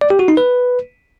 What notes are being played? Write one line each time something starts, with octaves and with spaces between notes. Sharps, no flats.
D5
G4
F#4
D#4
B4